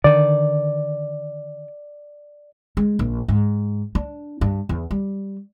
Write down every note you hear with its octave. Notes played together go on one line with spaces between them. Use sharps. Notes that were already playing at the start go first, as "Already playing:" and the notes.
D3 D#3 D5
G#3
A#1
G#2
D4
G2
E2
G3